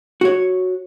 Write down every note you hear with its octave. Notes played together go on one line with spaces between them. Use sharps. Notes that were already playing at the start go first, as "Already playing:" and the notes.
F#4 C#5